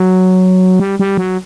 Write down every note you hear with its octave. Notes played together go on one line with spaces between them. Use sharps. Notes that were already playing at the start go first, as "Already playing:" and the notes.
Already playing: F#3
G3
G3
F#3